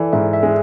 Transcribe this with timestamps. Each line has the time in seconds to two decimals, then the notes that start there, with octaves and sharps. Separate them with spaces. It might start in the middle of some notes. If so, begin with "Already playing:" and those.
Already playing: E3 A4 D5
0.13 G#2 E5
0.33 E5
0.43 G#3